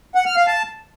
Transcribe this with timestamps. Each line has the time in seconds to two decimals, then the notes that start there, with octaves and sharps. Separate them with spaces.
0.15 F#5
0.26 F6
0.36 F5
0.47 A5